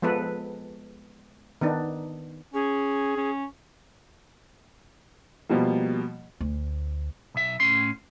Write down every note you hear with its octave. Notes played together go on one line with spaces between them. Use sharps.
F3 G#3 B3 A4 B4
D#3 B3 D4 D#4
C#4 G#4
C#4
B2 F3 G3 A#3
D2
B1 E5
A2 C#4 C6